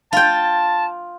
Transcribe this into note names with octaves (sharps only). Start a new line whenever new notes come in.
F4 G5 A5